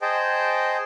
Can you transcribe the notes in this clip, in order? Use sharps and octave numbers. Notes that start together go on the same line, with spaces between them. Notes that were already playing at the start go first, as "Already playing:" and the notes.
G#4 C5 D#5 G5 A5